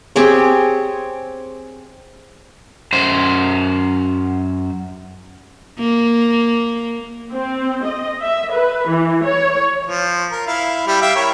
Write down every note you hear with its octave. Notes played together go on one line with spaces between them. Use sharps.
C4 G4 G#4 C#5
F#2 C5
A#3
C4
D#5
E5
B4
E3
C#5
F3
A#4
E4 F5
G3 E4 G4
E5 F5 G5
E4 A#4 C#5